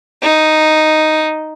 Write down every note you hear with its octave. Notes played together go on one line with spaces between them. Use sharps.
D#4